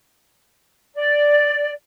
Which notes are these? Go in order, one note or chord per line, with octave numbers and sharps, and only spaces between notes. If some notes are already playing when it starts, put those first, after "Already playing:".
D5